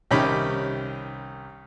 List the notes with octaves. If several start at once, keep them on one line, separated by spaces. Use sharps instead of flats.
C2 D#3 C#4 G4 B5 D6